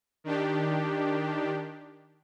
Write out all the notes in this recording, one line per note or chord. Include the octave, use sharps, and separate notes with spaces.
D#3 D4 G4